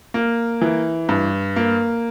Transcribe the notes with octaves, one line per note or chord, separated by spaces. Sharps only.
A#3
E3
G2
A#3